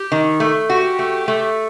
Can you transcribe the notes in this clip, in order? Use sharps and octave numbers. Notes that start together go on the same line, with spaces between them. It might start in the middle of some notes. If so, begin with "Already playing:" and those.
Already playing: G4
D#3
A3
F#4 G4
A3
A3